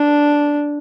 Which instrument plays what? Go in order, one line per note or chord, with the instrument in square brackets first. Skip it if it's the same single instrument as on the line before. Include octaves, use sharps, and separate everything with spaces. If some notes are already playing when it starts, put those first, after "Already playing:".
Already playing: [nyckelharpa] D4